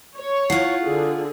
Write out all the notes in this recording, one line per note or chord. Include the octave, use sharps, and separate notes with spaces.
C#5
E4 F4 F#5 C7
D3 G#4